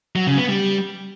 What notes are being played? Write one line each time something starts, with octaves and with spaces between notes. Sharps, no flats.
F#3
C#3
B3
G3